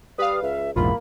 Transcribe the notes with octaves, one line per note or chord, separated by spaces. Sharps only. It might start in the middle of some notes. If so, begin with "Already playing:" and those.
G3 B4 F5 D#6
C#2 E5
A#1 E2 G#2 A#3 F4 B5